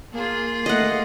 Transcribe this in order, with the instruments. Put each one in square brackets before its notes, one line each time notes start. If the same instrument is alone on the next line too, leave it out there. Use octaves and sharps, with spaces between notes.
[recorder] A#3 [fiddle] F4 G#4
[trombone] A3 [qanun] D#5 F#5